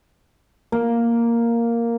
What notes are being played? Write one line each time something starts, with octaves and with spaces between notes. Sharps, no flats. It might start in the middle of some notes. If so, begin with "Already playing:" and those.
A#3